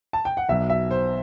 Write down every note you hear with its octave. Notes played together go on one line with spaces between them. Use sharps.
A5
G5
F#5
B1 B2 F#3 E5
E5
C5